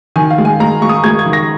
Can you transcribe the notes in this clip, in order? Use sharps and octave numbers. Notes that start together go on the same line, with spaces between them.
D#3 G#5
F5
G#3
G#5
G#3 A#5
G#3 C#6
D#6
G#3 G#6
G#6
D#3
A#6